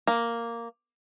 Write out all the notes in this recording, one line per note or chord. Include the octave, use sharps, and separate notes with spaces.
A#3